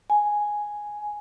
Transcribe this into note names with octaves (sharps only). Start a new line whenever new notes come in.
G#5